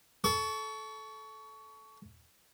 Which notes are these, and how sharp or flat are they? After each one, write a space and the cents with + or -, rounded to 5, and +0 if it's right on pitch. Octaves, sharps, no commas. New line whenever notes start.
A4 -15 C#6 +25